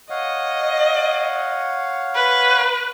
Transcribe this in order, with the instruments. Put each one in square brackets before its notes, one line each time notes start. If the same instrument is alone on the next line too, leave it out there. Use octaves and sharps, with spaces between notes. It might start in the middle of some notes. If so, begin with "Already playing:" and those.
[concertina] C#5 F5 F#5 [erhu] D#5
[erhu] B4